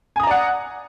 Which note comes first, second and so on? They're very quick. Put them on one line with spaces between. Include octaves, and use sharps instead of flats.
G#5 D#6 A#5 D5 F#5